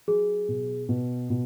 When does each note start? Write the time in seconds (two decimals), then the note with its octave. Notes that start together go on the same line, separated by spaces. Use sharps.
0.07 F#3 G#4
0.48 B2
0.89 B2
1.30 B2